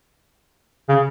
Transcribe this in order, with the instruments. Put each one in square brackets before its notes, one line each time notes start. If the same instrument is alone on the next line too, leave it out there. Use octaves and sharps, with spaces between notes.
[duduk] C#3